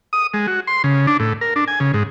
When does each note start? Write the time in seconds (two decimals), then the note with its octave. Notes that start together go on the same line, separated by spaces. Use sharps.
0.13 D#6
0.34 G#3
0.47 F#4
0.67 C6
0.84 C#3
1.07 D4
1.20 A2
1.41 A#4
1.56 D4
1.68 G#5
1.80 C#3
1.94 G#2